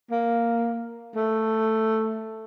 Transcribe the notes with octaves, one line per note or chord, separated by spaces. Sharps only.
A#3
A3